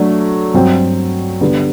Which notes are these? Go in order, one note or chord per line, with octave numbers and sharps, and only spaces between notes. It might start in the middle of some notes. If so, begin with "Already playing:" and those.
Already playing: F#3 A3 D4
G2 F#3 C4
D3 G3 B3